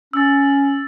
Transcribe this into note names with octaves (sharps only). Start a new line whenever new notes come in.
C#4 E6 A6